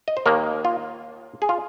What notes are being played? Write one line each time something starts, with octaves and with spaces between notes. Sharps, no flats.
D#5
C5
D#2 D#3 A#3 A#4
F4
G#4
F4